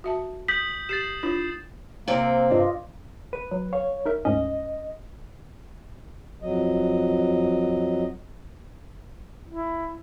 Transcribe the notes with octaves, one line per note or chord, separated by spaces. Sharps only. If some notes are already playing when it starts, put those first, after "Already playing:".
F#4 E5 A5
D#6 G6 B6 F#7
G4 A6 C7 E7
D4 E4 F4
C3 A#3 C4
G2 F4 D5 D#5
B4 D#7
F#3
C#5 F5
D#4 A#4 E5
D2 G#2 C#4 D#5
F2 F#3 D#5
E4